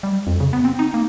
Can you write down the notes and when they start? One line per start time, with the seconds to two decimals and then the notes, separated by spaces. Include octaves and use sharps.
0.03 G3
0.27 F2
0.40 C#3
0.53 B3
0.65 C4
0.79 D#4
0.94 A#3